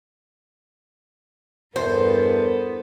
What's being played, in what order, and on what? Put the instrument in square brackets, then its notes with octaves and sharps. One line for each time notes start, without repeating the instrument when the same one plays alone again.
[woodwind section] E2 [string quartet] G2 B3 A4 [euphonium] A#4 [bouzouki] C5